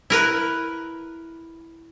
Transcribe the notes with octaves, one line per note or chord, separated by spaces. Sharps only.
E4 A#4 B4